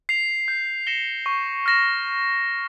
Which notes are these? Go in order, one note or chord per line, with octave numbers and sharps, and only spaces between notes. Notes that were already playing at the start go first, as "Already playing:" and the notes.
C7 F7
G6
A#6 C#7 E7 G7
C#6
F6 A#6 E7